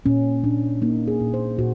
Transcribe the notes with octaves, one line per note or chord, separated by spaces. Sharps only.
A#2 C#4
A#2 D4
A#3 D#4
G#4
A#2
C5
A#2 F#4